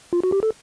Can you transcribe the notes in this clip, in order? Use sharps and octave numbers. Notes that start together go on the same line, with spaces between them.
F4
F#4
G4
A4